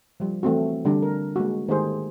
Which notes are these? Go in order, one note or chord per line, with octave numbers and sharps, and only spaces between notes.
F3 G3
E3 A3 C4 F#4
D3 G3 D4
A#4
G#3 A#3 F#4
D#3 G#3 A3 G4 G#4 C5